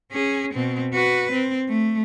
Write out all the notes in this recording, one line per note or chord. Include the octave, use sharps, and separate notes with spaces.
C#4 G#4
B2 C4
F#4 B4
C4
A3